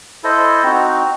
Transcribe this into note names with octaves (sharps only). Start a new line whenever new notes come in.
E4 A4 C5 D#5
C4 D#4 F#4